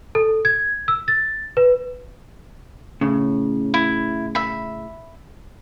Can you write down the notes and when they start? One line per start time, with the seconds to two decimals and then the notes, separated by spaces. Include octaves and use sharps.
0.15 A4
0.45 G#6
0.88 E6
1.08 A6
1.57 B4
3.01 A2 C#3
3.74 E4
4.35 E5 B5